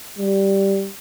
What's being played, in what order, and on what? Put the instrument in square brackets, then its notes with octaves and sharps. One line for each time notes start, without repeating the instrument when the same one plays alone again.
[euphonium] G3